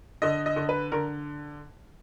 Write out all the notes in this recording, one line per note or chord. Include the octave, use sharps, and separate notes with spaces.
D3 D#5
D#5
D3
B4
D3 A#4